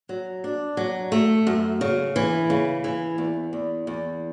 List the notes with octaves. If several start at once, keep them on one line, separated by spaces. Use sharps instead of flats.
F#3
D4
F#3
A3
F#2
C#3
E3
C#3
E3
E2
E2
E2